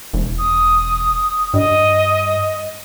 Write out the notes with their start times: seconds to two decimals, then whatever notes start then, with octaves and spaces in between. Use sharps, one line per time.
0.13 E1
0.38 D#6
1.54 G2 D#5